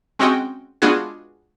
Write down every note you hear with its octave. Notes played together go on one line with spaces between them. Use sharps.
G#3 C4 C#4 F#4 D#5 G5
G#3 B3 D4 F4 F#4 G#4